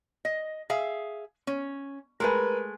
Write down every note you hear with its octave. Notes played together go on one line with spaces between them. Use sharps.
D#5
G#4 E5 F5
C#4
G#3 A3 G#4 A#4 B4